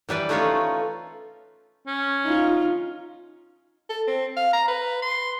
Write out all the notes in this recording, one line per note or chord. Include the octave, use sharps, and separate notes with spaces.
E3 G3 B4 D5
A3 C#4 D#4 F4 B4 C#5
C#4
D#4 F4
A4
C4
F5
A#5
B4
C6